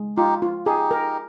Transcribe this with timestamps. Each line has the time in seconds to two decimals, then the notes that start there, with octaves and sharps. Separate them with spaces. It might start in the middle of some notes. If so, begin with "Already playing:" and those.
Already playing: G#3
0.17 D#4 F4 G4
0.42 F4
0.66 D#4 G4 G#4
0.91 A#4